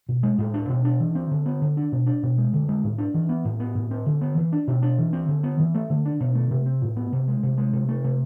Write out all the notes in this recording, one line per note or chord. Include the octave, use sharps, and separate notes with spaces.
B2
G#3
A2
D4
B2
D4
E3
C4
D3
B3
D3
D4
B2
D4
B2
G#3
D3
G#3
A2
D4
E3
B3
A2
B3
A2
C4
D3
B3
E3
D4
B2
D4
E3
C4
D3
B3
E3
A3
D3
D4
B2
A3
C3
C4
A2
B3
C3
G#3
C3
G#3
C3
A3
C3